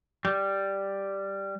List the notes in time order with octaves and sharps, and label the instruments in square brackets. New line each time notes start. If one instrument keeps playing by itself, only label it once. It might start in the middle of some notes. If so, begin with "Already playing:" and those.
[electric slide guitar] G3